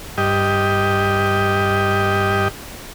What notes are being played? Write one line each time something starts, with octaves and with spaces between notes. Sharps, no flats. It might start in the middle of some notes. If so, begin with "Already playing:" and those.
G2 G4 D#5